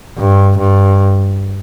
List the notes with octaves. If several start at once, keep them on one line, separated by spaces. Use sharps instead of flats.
G2
G2